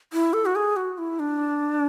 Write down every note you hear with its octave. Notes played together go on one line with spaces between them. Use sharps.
E4
A4
F#4
G#4
F#4
E4
D4